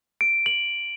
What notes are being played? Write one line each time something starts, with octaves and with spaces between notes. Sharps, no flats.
D7
F#7